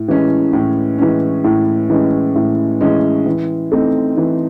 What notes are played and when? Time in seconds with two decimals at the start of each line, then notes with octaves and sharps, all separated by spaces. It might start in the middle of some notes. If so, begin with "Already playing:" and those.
Already playing: A2
0.08 E3 G#3 C#4
0.53 A2
0.98 E3 G#3 C#4
1.44 A2
1.90 E3 G#3 C#4
2.36 A2
2.81 E3 G#3 C#4
3.26 E3
3.72 A3 C4 D#4
4.17 E3